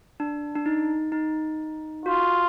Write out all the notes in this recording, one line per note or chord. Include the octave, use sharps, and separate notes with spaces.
D4
D4
D#4
D#4
F4 F#4